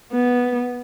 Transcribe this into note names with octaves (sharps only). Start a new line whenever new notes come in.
B3